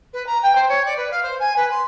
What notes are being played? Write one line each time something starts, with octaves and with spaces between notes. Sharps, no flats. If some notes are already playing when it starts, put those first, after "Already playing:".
B4
A#5
G5
C5
C#5
D5
B4
F5
C5
G#5
B4
C6